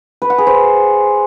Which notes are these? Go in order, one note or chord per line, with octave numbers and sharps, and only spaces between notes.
B4
F#5
G#4
C5